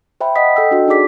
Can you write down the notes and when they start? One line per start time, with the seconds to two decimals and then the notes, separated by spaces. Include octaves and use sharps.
0.21 C5 E5 G5 B5
0.36 D#5 F#5 D#6 B6
0.56 A4 D#5 G5 E6
0.71 D4 F#4
0.88 D#4 G#4 D5 D6 B6